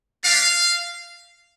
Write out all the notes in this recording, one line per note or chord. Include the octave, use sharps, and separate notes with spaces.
G3 D4 G4 F5